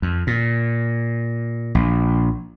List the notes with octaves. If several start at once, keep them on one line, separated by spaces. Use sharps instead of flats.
F2
A#2
A#1